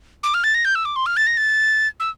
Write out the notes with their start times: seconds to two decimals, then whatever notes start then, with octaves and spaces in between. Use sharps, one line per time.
0.23 D6
0.34 F6
0.44 A6
0.55 A#6
0.65 G6
0.75 E6
0.85 D6
0.96 C6
1.06 F6
1.17 A6
1.27 A#6
1.37 A6
2.00 E6